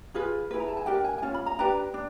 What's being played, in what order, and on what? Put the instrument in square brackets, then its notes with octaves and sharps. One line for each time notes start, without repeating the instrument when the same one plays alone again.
[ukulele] F4 G#4 B4
E4 G#4 B4
A#5
A5
G#5
D4 G4 A#4 G5
G#5
G#5
C#4 F4
B5
A#5
D4 G4 B4 A#5
D4